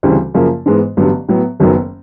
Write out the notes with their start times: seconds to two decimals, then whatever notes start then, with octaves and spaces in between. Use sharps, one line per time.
0.03 D2 C#3 E3 G3 C4
0.34 F#2 C#3 F3 A#3
0.66 G#2 E3 G#3 B3
0.97 A1 G2 D3 F#3 B3
1.28 A2 F#3 B3
1.60 F#1 F#2 D#3 F#3 B3